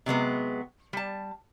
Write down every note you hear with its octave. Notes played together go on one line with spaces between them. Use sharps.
C3 F#3 G#3 B3
G3 A5